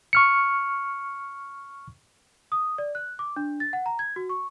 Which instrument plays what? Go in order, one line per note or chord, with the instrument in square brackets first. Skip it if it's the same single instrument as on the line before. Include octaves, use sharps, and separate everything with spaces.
[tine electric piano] C#6 F6 C#7
[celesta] D#6
D5
F#6
D6
D4
A6
F#5
A#5
G#6
F#4
C#6